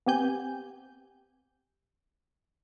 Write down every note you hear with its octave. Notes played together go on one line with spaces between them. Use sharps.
B3 C4 G4 G#5 G6